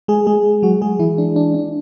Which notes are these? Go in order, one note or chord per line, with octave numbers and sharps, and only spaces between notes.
G#3 G#4
G#3 G#4
F#3 F#4
G#3 G#4
E3 E4
D4
D4
D4